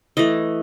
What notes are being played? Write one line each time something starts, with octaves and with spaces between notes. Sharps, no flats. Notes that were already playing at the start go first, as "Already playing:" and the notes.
E3 A3 D#5